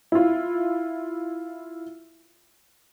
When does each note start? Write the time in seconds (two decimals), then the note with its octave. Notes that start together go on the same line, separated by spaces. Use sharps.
0.12 E4 F4